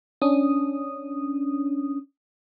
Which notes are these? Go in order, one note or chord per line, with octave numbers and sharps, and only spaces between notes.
C#4 D4 D#6